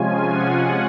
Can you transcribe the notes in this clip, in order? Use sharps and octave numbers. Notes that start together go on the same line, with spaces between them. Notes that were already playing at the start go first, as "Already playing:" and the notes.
Already playing: C3 F3 G#3 C#4 F4 G#5
F#5